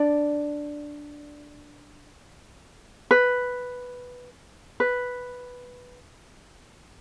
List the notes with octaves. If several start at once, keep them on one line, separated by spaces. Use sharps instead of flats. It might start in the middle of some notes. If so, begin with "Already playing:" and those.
Already playing: D4 D5
B4
B4